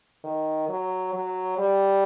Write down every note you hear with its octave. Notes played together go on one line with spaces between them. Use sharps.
D#3
F#3
F#3
G3